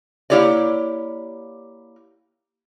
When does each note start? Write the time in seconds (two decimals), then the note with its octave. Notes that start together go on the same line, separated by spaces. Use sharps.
0.30 A#3 E4 G4 C#5 D5